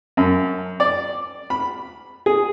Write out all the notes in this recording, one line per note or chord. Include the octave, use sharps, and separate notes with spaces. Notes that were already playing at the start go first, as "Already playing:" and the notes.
F#2
D5
B5
G#4